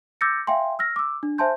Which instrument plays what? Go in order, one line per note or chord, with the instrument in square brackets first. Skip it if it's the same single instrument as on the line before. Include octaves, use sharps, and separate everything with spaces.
[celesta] D6 E6 G6 A6 A#6 C#7
E5 F5 G5 G#5 C6
E6 F6 A#6
D6 E6
D4
C5 E5 G#5 A5 C6 G6